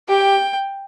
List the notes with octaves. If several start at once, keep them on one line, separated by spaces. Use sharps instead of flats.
G4 G5